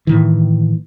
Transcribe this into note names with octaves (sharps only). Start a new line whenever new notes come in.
A2 D#3 E3